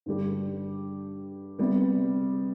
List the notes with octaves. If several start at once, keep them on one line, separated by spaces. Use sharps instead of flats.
G2 D3 G3 D4 G4
C3 G3 B3